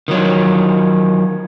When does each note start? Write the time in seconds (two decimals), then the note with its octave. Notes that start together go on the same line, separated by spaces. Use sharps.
0.08 D#3 F3 F#3